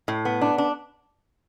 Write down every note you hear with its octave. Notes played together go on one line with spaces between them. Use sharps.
A2
B3
D4
D4